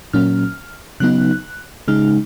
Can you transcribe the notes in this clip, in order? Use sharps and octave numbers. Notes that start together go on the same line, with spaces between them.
A#2 F#3 A#3 C#4 F6
C#3 F#3 B3 D#4 F#6
C#3 G#3 D#4 F6